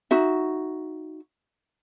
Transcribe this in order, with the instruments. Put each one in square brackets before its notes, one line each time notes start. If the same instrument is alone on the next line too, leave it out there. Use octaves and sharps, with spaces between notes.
[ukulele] D#4 F#4 E5